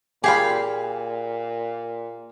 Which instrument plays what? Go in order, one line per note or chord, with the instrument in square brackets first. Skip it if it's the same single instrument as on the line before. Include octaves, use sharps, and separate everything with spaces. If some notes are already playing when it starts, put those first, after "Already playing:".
[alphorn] A#2 [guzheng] F4 G4 [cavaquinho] G#4 F5 B5